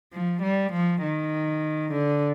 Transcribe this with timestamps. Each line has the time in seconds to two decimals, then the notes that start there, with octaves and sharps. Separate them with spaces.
0.13 F3
0.42 G3
0.73 F3
1.02 D#3
1.92 D3